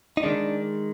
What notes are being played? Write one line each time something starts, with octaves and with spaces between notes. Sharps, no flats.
D#4
D#3 G#3 D4